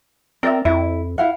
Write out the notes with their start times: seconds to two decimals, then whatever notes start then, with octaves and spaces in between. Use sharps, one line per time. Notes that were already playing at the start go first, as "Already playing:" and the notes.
0.43 C4 A#4 D5 E5
0.65 F2 E4
1.18 E4 F5 F#5